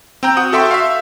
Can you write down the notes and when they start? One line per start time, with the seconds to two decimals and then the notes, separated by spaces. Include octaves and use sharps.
0.23 C4 G5 A#5 G6
0.37 F#4 F#5 D#6
0.52 F#4 A4 E5 G5 C6 C#6
0.71 E5 F5